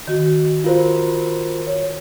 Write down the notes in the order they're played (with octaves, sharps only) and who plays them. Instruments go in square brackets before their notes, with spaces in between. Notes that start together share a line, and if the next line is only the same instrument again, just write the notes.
[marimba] D#3 F#4
[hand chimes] F4 A#4 C5
[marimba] C#5